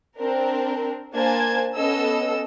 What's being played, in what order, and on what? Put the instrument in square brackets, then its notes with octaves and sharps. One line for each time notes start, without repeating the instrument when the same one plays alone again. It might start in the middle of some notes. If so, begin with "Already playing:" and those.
[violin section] C4 D4 A#4
A#3 D4 C5 G#5 A5 G#6
B3 C#4 A4 D#5 E6